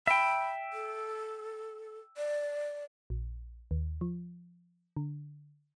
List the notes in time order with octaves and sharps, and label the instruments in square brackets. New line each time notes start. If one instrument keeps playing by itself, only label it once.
[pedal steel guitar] E5 G5 [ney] B5
[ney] A4
D5
[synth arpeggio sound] A#1
D#2
F3
D3